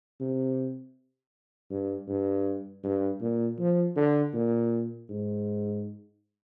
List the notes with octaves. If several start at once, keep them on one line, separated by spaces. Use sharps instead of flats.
C3
G2
G2
G2
A#2
F3
D3
A#2
G#2